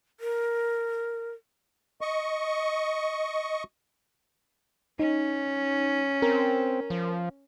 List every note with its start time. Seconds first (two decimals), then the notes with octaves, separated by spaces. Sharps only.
0.20 A#4
2.01 D#5 C#6
4.99 C#4 D#4
6.22 C4 A#4
6.90 F3